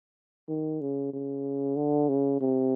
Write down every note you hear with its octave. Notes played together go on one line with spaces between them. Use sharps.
D#3
C#3
C#3
D3
C#3
C3